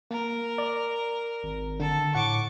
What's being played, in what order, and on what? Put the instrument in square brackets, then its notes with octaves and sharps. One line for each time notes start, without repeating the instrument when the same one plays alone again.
[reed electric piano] A#3 [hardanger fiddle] A#4
[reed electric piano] D5
[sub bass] G#1
[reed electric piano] D3 [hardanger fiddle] A4
[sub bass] A2 [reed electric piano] F#5 [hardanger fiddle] C#6 D6